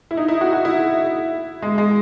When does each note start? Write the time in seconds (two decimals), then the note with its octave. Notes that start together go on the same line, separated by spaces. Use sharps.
0.11 E4
0.17 D#4
0.28 E4
0.41 F#4
0.53 F#4
0.65 E4
1.62 G#3
1.78 G#3